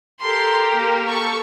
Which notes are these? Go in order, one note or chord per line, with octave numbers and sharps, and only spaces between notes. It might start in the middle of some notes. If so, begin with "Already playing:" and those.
G4 A4 A#4 C6
A#3
A4 C#6